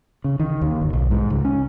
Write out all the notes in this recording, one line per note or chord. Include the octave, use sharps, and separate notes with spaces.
C#3
D#3
D#2
G1
B1
G#2
C#2
C#4